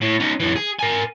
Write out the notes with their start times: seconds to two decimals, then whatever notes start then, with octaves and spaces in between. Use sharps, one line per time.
0.02 A2
0.20 C#4 D#4
0.40 F#2 E3
0.56 G#4
0.79 A#4 G#5